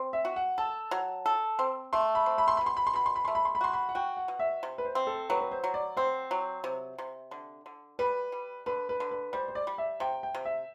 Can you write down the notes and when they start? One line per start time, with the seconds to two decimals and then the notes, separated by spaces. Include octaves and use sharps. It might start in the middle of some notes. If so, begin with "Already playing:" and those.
Already playing: C4
0.13 E5
0.25 F#4
0.36 F#5
0.58 A4 A5
0.91 F#3
1.26 A4
1.59 C4
1.93 A3 C6
2.15 B5
2.26 C4
2.38 B5
2.48 C6
2.57 B2 B5
2.66 C6
2.77 B5
2.87 C6
2.93 B2 B5
3.06 C6
3.16 B5
3.25 A3 C6
3.35 B5
3.45 C6
3.55 B5
3.61 F#4 C6
3.73 B5
3.89 F#5
3.95 F#4 G5
4.17 F#5
4.28 B2
4.39 E5
4.63 C3
4.78 B4
4.85 C5
4.95 C4
5.07 A4
5.30 F#3 B4
5.41 B4
5.52 C5
5.64 F#3
5.74 D5
5.97 C4 C5
6.31 F#3
6.64 C3
6.98 C3
7.31 D3
7.66 D3
7.99 G3 B4
8.32 G3
8.66 D3 B4
8.89 B4
9.00 D3
9.11 B4
9.33 G3 C5
9.48 C5
9.55 D5
9.67 G3
9.78 E5
10.00 C3 G5
10.23 G5
10.34 C3
10.45 E5